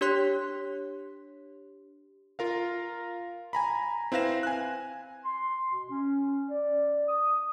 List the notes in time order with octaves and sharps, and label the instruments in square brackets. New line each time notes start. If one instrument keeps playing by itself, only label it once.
[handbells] D4 G4 C#5 C6 F#6 B6
[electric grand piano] F4 A#4 F5
G#5 A#5 B5
C4 E4 B4 F5 A#6 E7
G#5 F#6
[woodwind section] C6
B2
C#4
D5
D#6